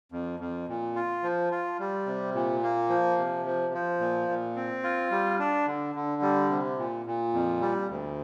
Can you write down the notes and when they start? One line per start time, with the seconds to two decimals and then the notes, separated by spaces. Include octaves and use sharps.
0.12 F2
0.40 F2
0.69 A#2
0.96 F4
1.23 F3
1.52 F4
1.79 G3
2.06 C3
2.35 A#2
2.63 A#3
2.90 F3
3.18 C3
3.46 F3
3.74 F3
4.00 A#2
4.28 A#2
4.56 C4
4.83 F4
5.11 G3
5.39 D4
5.67 D3
5.95 D3
6.22 G3
6.50 C3
6.78 A#2
7.06 A#2
7.33 F2
7.61 G3
7.89 D2